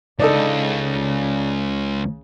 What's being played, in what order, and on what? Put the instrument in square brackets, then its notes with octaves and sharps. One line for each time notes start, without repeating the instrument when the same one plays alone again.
[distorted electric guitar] C#2 [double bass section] C#3 [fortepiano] D4 D#4 A4